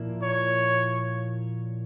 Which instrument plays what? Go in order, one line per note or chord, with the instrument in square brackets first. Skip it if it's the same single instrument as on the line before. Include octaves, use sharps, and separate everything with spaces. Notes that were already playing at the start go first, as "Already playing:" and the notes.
Already playing: [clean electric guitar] A#2 F3 A#3 E4 A#4
[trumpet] C#5